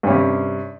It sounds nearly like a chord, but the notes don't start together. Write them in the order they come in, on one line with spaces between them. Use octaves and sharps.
G2 C#4 C3